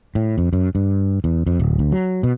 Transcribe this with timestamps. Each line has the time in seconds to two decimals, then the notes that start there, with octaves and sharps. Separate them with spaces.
0.15 A2
0.38 F2
0.53 F#2
0.75 G2
1.24 E2
1.47 F2
1.60 D1
1.79 D2
1.92 F#3
2.23 B2